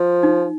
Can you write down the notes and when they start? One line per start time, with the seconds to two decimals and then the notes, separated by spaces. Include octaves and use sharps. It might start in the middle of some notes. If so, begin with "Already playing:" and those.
Already playing: F3
0.23 D#4